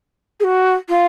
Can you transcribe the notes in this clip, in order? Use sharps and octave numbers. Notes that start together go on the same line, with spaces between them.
G#4
F#4
F4